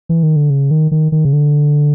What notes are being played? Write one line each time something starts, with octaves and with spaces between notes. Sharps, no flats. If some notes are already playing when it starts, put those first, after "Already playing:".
E3
D#3
D3
C#3
D#3
D#3
D#3
C#3
D3